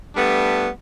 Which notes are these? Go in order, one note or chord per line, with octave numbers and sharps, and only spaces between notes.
G3 A3 B3 D4